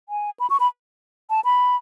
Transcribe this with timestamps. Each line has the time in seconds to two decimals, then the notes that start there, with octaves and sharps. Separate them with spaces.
0.09 G#5
0.40 B5
0.50 C#6
0.60 B5
1.30 A5
1.45 B5